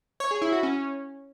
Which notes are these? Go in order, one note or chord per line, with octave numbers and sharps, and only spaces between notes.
C#5
G#4
E4
F#4
C#4